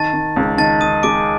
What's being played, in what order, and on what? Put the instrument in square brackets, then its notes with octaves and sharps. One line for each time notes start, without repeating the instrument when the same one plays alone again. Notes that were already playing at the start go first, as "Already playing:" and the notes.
Already playing: [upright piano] D#3 [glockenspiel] A5 A6
[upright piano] D#3
C#2
[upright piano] D#3 [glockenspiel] A5 A6
[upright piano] D#3 [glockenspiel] D#6 D#7
[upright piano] G#3 [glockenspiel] D6 D7